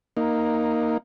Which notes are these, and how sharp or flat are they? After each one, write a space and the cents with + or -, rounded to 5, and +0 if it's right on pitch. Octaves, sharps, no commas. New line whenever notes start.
A#3 +0 D#4 +0